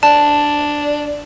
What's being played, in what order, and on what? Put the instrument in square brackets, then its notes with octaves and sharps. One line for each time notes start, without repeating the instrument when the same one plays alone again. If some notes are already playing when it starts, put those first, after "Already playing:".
[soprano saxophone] D4 [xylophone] A5